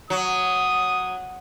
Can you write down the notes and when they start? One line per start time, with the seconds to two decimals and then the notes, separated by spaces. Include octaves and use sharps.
0.10 F#3 D#6